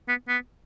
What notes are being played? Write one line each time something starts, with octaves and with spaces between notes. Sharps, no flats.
B3
B3